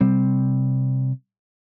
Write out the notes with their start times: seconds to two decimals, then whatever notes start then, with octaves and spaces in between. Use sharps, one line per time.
0.01 C3 G3 C4